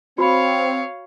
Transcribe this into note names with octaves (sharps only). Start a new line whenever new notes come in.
C4 F#4 C#5 F5 B5